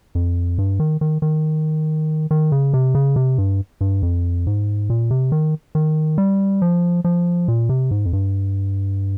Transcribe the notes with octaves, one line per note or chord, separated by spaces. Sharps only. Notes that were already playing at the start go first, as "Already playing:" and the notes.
F2
G2
D#3
D#3
D#3
D#3
C#3
C3
C#3
C3
G2
G2
F2
G#2
A#2
C3
D#3
D#3
G3
F3
F3
A#2
C3
G#2
F2
G2